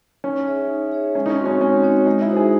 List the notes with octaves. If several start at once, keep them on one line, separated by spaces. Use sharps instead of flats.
C#4 D#4
G#4 C#5 E5
D#4
G#4 C#5 E5
G#3 C#4
D#4
C#4
C4 D#4 F#4 C#5
C#4
G#3 C#4
C4 D#4 F#4 C#5
G#3 D#4
E4
D#4 F#4 C5
G#4